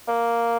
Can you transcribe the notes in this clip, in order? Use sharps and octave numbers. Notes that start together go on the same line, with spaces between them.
A#3